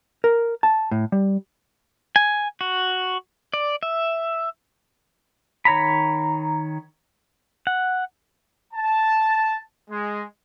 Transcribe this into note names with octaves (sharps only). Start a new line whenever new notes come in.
A#4
A5
A2
G3
G#5
F#4
D5
E5
D#3 C#5 A#5 B5
F#5
A5
G#3